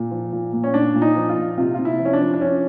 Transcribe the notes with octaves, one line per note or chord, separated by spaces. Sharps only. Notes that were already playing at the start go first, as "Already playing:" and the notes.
Already playing: A#2
F3
A#2
A#2
C#4
A#2 D4
A#2
D#4
F3
F4
A#2
C3 F4
C3 F4
E4
F3
C#4
D4
F3
D4
F3 C#4